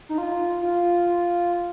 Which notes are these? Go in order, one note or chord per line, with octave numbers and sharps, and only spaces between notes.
D#4
F4
F4